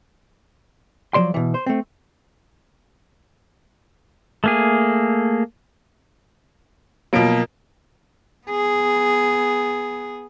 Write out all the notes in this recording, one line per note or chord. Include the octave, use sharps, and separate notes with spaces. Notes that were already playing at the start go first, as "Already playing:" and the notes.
F3 F#3 D5 C6
B2 E3
C5
A3 C4
A3 A#3 G#4
B2 F3 F#3 A#3 D7
B3 G#4